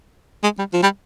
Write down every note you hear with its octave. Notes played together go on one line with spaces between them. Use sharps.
G#3
G3
F3
G3